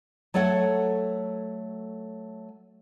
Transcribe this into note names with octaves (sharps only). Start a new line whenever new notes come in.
F#3 A3 A4 C#5 F#5